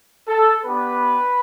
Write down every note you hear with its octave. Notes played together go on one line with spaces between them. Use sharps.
A4
B3 D4 G4 B4